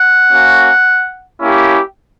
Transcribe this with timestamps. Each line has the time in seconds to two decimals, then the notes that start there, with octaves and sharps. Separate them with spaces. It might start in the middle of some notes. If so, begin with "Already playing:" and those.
Already playing: F#5
0.31 A#3 C#4 F#4
1.41 A#3 C#4 E4 G4